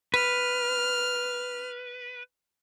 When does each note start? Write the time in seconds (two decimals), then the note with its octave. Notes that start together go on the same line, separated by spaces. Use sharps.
0.14 B4 F6